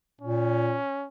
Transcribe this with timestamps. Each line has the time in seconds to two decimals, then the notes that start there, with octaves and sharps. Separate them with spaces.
0.21 A#2 C#4